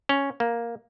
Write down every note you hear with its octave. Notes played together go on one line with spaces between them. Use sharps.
C#4
A#3